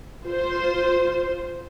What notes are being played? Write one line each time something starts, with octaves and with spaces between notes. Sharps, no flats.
F4 C5